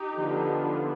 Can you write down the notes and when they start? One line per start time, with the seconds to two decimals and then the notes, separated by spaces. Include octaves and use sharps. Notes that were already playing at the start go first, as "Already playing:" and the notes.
Already playing: D#4 G4
0.16 D3 F3 B3 D4